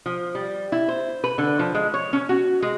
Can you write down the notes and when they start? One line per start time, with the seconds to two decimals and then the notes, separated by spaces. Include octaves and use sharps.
0.06 F3
0.35 G3
0.72 E4
0.88 C5
1.24 B4
1.38 D3
1.59 F3
1.74 G#3
1.94 C#5
2.13 C#4
2.29 F#4
2.62 G#3